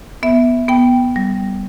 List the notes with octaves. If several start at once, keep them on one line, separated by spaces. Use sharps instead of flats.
B3 E5
B3 G5
G3